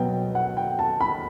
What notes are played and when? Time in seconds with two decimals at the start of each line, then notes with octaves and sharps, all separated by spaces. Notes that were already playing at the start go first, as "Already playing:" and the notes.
Already playing: B2 F#3 B3 G5
0.35 F#5
0.57 G5
0.79 A5
1.01 B5